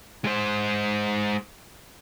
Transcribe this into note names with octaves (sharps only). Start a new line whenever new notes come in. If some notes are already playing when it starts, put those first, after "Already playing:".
G#3 C5